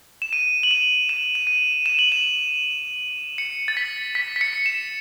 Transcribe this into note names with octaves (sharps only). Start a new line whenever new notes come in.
E7
D#7
F#7
E7
E7
E7
D#7
E7
F#7
E7
C#7
A6
B6
B6
B6
C#7
E7